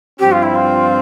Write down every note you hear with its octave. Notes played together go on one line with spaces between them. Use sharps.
G2 F3 C4 G4
F4
E4
F4